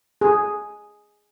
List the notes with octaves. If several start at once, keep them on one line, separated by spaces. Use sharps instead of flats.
G#4